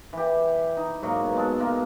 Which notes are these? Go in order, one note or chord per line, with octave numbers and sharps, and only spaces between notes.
E3 G4
D#4
G#2 F#3 A#3
B2
G#3 A4
B2 G#3 A#3 F4